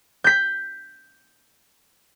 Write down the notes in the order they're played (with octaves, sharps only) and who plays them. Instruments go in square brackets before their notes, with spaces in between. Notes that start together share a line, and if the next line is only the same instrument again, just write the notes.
[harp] G6 B6